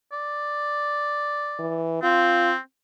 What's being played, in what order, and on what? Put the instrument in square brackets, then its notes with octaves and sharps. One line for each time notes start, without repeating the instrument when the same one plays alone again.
[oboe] D5
[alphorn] E3
[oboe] C4 [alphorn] F4